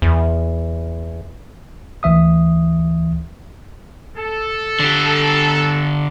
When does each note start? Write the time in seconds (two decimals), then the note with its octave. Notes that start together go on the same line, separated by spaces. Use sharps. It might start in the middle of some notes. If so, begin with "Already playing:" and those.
0.02 E2
2.03 D2 E3 E5 D#6
4.17 A4
4.80 D3 G4